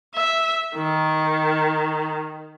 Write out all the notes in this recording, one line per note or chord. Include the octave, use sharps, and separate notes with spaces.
E5
D#3